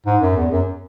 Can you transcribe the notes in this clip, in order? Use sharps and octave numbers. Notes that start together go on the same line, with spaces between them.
G#2
F#2
E2
F#2